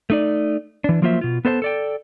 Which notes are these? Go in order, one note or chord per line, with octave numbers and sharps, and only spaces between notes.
A3 D#4 D5
E3 D4
F3 F#3 A#3 F4 C5 E5
B2 F4
B3 A4 C5 D#5 A5
A4 D5 G5